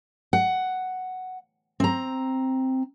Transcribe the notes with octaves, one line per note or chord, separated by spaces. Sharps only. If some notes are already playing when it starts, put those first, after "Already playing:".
F#5
C4 A#5